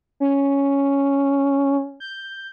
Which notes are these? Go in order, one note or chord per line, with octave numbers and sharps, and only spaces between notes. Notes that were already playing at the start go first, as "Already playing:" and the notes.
C#4
G6